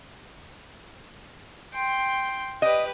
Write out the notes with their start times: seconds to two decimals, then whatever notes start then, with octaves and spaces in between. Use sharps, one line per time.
1.74 G5 C6
2.62 G4 B4 D#5